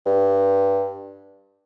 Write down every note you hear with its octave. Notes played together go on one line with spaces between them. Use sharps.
G2